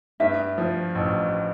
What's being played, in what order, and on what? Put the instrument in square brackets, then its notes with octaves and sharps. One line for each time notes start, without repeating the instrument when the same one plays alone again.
[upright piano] G2 [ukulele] E5
[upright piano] F3
A1